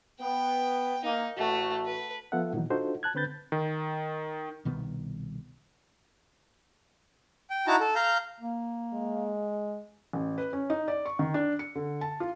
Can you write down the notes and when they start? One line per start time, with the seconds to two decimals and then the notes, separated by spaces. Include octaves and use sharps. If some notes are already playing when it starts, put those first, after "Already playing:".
0.20 B3 G5
1.04 A#3 D#4
1.37 A1 A3 F#4
1.86 B4
2.32 F3 B3 F4 A4 E5 F#5
2.53 A#2 D#3 E3 F#3 D#4
2.70 D4 D#4 F4 F#4 A4 C5
3.03 A5 F#6 G#6
3.15 D3 C4 B4 B5 G6 A6
3.52 D#3
4.65 C2 B2 D#3 B3
7.50 G5
7.67 D#4 E4 F#4 A5 A#5
7.80 A4
7.95 F5 A#5 G6
8.40 A#3
8.93 G#3
10.13 A1
10.38 B4
10.53 C#4
10.70 D#4
10.88 D5
11.06 C#6
11.19 D#3
11.34 D4
11.59 C#7
11.75 D3
12.01 A5
12.20 F4